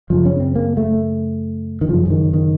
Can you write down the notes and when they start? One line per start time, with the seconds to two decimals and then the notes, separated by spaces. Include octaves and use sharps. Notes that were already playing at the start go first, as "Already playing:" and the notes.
0.10 F#2 C#3 F3
0.26 C#4
0.40 C4
0.55 A#3
0.77 A3
1.81 D#3
1.88 F#2 C#3 F3
2.05 F3
2.10 D#3
2.33 D#3